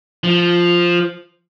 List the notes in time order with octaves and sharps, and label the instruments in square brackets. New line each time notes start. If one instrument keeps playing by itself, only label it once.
[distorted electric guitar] F3